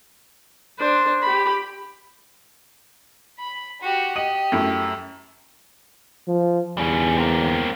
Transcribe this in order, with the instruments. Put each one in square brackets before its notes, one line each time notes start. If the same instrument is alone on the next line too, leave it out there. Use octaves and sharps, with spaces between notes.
[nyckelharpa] D4 C5
G4 B5
[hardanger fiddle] B5
F#4 G4
[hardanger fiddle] G4 [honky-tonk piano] D#5 D#7 F#7
[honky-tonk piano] F#2 A3 E4
[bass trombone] F3
[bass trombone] E2 [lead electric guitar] G3 C#4
[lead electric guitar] A#3 C4